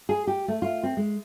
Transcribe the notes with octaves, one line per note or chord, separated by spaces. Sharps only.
G#4
G4
A3
F4
C4
G#3